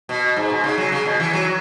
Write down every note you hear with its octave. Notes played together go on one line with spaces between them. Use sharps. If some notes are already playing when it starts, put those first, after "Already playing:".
B2
G#2
B2
C#3
F#3
C#3
B2
E3
F#3